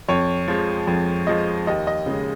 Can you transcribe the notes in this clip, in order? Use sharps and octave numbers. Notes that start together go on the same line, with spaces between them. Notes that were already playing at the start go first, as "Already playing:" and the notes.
F2 C#5
F3 G#3
F2
F3 G#3 D#5
D#2 D#5
D#5
C#3 G#3